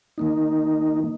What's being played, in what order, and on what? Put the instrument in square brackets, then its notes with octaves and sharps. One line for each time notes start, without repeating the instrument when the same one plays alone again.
[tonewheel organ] D#3 A#3 D#4